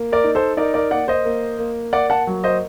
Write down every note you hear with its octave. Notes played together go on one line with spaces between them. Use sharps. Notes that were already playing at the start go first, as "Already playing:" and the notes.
Already playing: A#3
A#4 D5
D#4
A4 C5
D#4 A#4 D5
A#4 D5
A#3 D5 F#5
C5 D#5
A#3
A#3
A#3 D5 F#5
F#5 A5
F#3
C5 D#5